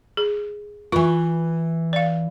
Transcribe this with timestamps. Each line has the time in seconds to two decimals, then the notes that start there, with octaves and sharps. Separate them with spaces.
0.17 G#4
0.92 E3 F4 B4 C#6
1.93 D5 F5